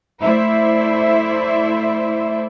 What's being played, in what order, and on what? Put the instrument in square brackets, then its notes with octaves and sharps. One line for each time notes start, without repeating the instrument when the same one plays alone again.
[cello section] A3 E4 C5 D5 E5